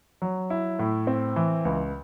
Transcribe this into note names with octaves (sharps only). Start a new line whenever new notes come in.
F#3
E4
A2
C4
E3
C#2